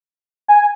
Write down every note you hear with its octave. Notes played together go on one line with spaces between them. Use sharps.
G#5